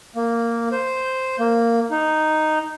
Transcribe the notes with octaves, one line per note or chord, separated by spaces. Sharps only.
A#3
C5
A#3
D#4